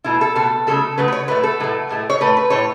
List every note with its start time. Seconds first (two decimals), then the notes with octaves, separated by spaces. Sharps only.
0.04 B2 A3 E4
0.21 A4
0.35 B2 A3 A4
0.67 C#3 F#3 A3 A4
0.98 C#3 F#3 A3 B4
1.08 B4
1.12 C#5
1.28 A2 F#3 A3 B4
1.43 A4
1.60 A2 F#3 A3
1.90 A2 A3
2.10 C#5
2.21 A2 A3 B4
2.37 B4
2.50 A2 A3 C#5